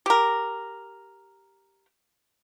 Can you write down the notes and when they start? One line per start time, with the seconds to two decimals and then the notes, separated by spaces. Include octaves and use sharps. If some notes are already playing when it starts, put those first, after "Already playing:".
0.06 G4 A#4